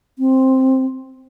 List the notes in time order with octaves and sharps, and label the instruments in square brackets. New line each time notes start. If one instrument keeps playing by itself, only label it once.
[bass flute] C4